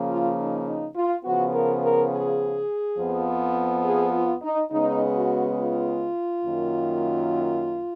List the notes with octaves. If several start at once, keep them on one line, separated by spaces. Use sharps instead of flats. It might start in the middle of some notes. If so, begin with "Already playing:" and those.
Already playing: C#3 F3 A#3
F4
D#4
D#4
F4
C#3 F3 B3 F#4
A#4
A#4
G#4
F2 F3 B3
G#4
F4
D#4
C#3 G#3 B3 D#4
F#4
F4
F#2 D#3 A#3